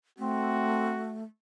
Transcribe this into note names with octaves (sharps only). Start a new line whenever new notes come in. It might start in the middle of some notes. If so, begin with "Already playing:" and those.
A3 C4 F#4